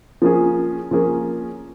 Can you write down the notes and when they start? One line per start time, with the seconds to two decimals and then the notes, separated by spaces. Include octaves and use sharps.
0.22 F3 A#3 C#4 G#4
0.91 F3 A#3 C#4 G#4